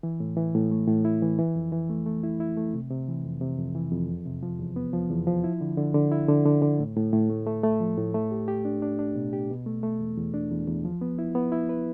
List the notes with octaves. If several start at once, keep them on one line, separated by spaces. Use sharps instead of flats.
E3
A2
E3
A2
A3
A2
E4
E3
E3
F2
E3
A3
A3
E4
E4
A3
C3
C3
E3
F2
C3
F2
E3
F2
E2
C3
F3
E2
B3
F3
E2
F3
E4
D3
D3
D3
E4
D3
D3
D3
A2
A2
A2
A3
A3
A3
F3
A2
A3
G4
G4
D4
D4
D4
B2
G4
B2
A3
A3
E2
E2
D4
E2
E2
F3
B3
E4
B3
E4
B4